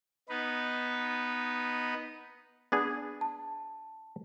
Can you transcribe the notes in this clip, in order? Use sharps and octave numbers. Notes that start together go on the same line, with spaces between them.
B3 D#4 B4
B3 D4 G#4
A5